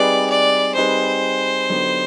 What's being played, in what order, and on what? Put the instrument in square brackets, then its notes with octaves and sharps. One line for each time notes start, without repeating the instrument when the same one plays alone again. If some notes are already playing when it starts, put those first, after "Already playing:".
Already playing: [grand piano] G3 C4 D#4 G#4 B4 [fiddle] D5
[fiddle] D5
[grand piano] G3 C4 D#4 G#4 B4 [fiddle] C5
[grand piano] D3 F#3 B3 D#4 G4